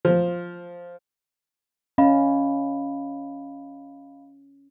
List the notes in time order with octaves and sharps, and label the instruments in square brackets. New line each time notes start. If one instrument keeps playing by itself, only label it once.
[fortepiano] F3
[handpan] C#4 [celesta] D#5 F5 B5